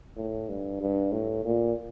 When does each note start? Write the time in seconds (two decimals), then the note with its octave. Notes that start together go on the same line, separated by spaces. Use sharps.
0.17 A2
0.49 G2
0.81 G2
1.12 A2
1.45 A#2